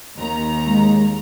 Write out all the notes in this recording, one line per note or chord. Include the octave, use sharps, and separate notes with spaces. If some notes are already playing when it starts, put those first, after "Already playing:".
D#2 A#5
G#3